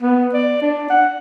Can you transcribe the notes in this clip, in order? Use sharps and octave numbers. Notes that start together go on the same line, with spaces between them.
B3
D5
D4
F#5